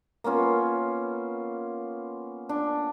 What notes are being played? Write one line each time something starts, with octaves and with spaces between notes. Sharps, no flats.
A#3 B3 C#4 F4
D4